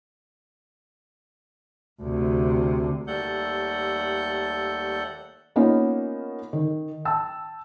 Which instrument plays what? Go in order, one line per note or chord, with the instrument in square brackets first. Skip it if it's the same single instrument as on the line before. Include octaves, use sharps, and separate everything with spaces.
[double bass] D2 C3
[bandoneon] D#2 G3 A3 A4 F#5 G6
[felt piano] A#3 B3 C#4 D#4 F4 C#5
D#3
G5 A5 E6